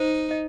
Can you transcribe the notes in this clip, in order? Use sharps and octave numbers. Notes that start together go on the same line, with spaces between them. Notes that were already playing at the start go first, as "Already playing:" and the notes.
Already playing: D#4 C5
D#5